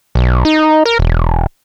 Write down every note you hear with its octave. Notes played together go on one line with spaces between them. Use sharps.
B1
D#4
A#4
E1